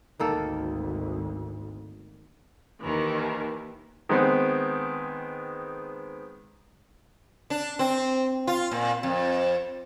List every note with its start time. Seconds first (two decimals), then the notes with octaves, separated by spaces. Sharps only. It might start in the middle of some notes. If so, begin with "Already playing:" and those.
0.20 G#1 D2 G#2 D#3 A#3 A4
2.80 D#2 D#3 E3
4.09 D#3 G#3 B3 C4
7.50 D4
7.79 C4
8.47 F4
8.71 A#2
9.03 F2